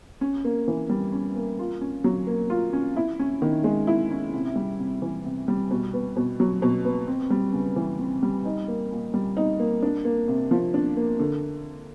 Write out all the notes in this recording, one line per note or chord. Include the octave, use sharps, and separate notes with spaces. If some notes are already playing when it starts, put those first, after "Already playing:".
C#4
A#3
E3
G3
C#4
A#3
F4
C#4
F#3
A#3
F4
C#4
E4
C#4
D#3
G#3
E4
C#4
C3
G3
C3
E3
C3
G3
B2
B3
B2
F#3
B2
B3
C4
G3
C#3
E3
C4
G3
D#4
A#3
A#2
G3
D#4
A#3
D4
A#3
C3
F3
D4
A#3
D3